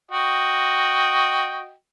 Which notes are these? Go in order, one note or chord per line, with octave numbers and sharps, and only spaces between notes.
F#4 D#5 G5